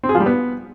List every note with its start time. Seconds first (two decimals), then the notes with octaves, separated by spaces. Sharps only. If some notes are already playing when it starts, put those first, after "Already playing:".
0.03 C4
0.09 G#4
0.15 F3
0.20 G3
0.26 B3